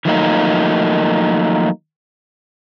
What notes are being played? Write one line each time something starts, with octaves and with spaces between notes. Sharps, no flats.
D#3 F3 F#3 A3 A#3 D#4